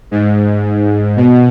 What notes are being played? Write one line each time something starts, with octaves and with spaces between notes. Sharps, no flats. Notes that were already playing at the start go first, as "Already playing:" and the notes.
G#2
B2